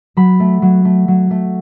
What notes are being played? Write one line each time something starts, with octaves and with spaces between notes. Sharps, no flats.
F#3 B5
A3
F#3
A3
F#3
A3